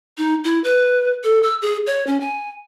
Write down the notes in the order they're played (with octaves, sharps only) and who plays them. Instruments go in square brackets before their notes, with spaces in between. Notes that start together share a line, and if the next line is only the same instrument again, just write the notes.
[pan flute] D#4
E4
B4
A4
E6
G#4
C#5
C#4
G#5